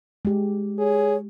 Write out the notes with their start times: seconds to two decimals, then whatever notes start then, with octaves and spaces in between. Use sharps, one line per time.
0.25 G#3 G4
0.79 G#4 C#5